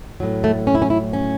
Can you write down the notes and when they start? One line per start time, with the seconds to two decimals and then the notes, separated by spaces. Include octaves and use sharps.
0.20 A2 F#3
0.44 A3
0.67 C#4
0.75 E4
0.82 C#4
0.90 E4
1.13 C#4